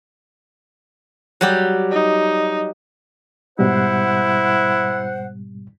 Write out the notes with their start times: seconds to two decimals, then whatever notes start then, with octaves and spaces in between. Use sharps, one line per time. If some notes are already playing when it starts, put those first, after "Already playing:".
1.41 F#3 G3 G4
1.92 D#4
3.59 G#2 B2 G3 E4 C5 F#5